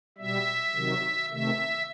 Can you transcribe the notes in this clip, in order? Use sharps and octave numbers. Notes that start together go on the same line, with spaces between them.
B2 G3 E5
C3 D#3 F#3
C3 D#3 A3 E5